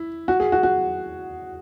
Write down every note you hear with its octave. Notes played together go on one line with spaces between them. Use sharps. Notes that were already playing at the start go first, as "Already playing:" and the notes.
Already playing: E4
F#4
G#4
F#4
F#4